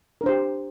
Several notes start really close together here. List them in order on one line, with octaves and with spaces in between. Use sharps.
A#4 D4 C5 G4